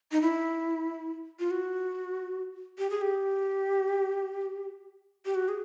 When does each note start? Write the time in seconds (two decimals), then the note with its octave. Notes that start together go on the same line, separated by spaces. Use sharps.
0.12 D#4
0.22 E4
1.39 F4
1.51 F#4
2.78 G4
2.90 G#4
3.01 G4
5.25 G4
5.35 F#4
5.48 G#4